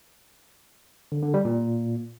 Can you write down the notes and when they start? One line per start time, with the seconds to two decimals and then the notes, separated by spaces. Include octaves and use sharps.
1.12 D3
1.23 D3
1.34 G3
1.45 A#2